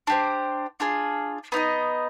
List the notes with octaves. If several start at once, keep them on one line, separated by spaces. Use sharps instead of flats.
D4 G4 C5
D4 F4 G#4
B3 D#4 B4 D#5